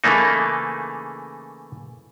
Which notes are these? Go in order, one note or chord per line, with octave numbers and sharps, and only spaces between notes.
C#3 E3 A3 A#3 D#4